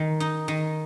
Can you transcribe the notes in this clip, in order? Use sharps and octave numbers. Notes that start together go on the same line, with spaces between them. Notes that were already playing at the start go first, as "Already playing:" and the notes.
Already playing: D#3
D#4
D#3